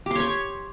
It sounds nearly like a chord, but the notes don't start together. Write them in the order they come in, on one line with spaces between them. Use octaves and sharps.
G4 C6 C#5 C#6